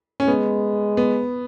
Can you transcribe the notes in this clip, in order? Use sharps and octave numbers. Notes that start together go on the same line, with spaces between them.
C#4
G#3 B3
B3